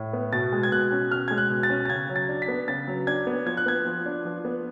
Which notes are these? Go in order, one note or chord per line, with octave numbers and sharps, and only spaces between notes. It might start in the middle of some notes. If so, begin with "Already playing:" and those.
Already playing: A2
B3
B2 A6
G#3
G#6
B2 F#6
C#4
B2 F6
G#3 G#6
F#6
B2
A6
C#4
A6
C#3 G#6
F#3
A6
D4
B6
B3
C#3 A6
F#3
D4 G#6
B3
F3 G#6
F#6
B3 G#6
F3
D4
F3
B3